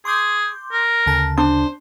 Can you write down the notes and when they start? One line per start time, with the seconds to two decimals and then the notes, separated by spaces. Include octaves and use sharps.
0.05 G#4 C6 D6 G6
0.72 A#4
1.06 D2 C#3 A5
1.38 D4 C5